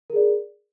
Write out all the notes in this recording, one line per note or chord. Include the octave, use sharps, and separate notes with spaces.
G#4 A#4 D5